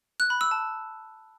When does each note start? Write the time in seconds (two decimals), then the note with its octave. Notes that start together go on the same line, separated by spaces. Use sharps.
0.20 F#6
0.30 B5
0.41 E6
0.51 A5